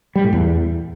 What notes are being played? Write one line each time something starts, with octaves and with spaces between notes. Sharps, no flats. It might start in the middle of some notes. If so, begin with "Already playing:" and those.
G3
A2
E2